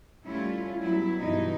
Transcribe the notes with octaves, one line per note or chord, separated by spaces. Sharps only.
G3 A3 C#4 E4 F4
F#3 G3 B3 E4
G2 B2 E3 D#4 E4